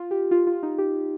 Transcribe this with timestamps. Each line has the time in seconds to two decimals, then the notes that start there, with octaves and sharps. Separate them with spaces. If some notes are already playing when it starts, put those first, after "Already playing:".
Already playing: F4
0.11 G4
0.31 F4
0.47 F4
0.63 D#4
0.78 G4